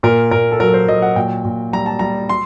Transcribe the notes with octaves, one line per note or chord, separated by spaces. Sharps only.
A#2 A#4
A#2 A#4
A4
F#3 A#4
C5
F#3 D#5
F#5
A#2 G5
A#2
G3 A#5
A5
G3 A#5
C6